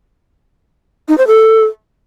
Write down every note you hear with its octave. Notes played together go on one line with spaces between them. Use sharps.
D#4
C5
A4